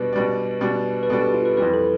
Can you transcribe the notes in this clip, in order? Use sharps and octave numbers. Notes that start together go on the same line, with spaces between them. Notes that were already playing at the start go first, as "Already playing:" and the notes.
Already playing: B2 G3 D4 B4
B2 G3 D4
B2 G3 D4
B4
B2 G3 D4 A4
G4
F4
B4
F2 E3 G3 B4
A4